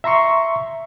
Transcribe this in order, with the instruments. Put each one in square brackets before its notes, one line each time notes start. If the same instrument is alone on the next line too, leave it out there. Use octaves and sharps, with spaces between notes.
[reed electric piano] E5 A#5 C6 C#6